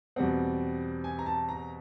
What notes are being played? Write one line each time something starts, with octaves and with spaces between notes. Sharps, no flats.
E2 B2 G3 C4 F#5
G#5
A#5
A5
A#5